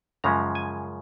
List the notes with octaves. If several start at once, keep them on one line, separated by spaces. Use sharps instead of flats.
F#2 C#3 F3 G#3 C#4 A#5
G#5